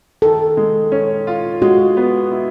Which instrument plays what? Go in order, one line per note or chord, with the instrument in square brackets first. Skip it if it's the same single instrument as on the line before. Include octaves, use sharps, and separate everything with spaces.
[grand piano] D#3 [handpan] A4
[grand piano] G#3
C#4
F4
[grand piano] G#3 [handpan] F#4
[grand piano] B3
E4